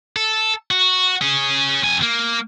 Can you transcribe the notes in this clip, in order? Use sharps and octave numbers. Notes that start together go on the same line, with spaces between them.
A4
F#4
C#4 G#4
F2 G#5
A#3